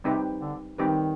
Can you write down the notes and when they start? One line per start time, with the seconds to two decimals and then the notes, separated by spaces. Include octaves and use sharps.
0.04 C3 G3 C4 D#4 G4 B4
0.41 D3
0.78 D#3 G3 C4 D#4 G4 B4